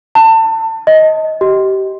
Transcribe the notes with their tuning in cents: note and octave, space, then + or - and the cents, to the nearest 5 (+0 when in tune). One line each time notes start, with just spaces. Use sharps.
A5 +25
D#5 +15
G4 -25